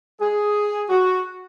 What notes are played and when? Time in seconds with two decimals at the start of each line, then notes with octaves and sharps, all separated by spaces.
0.20 G#4
0.89 F#4